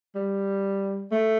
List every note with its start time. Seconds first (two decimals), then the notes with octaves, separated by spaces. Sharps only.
0.15 G3
1.12 A3